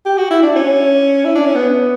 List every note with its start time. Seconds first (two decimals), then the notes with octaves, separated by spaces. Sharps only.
0.06 G4
0.18 F#4
0.30 E4
0.43 D4
0.56 C#4
1.25 E4
1.35 D4
1.45 C#4
1.55 B3